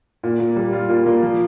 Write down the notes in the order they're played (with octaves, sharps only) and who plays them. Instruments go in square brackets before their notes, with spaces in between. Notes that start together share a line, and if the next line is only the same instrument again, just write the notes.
[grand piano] A#2
A#3
G3
F4
A#2
A#3
F3